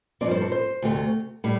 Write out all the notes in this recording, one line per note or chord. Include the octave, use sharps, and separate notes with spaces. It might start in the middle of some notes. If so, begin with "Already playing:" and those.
G2 F3 A3 C4 D5
C5
A4
C5
D2 C3 A3
A2 G3